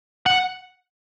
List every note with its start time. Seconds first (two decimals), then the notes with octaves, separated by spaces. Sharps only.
0.26 F#5